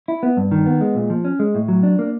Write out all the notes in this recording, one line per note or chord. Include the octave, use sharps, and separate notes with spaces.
E4
B3
G2
D#3
B3
G#3
A#2
F3
C#4
G#3
A2
F#3
D4
A#3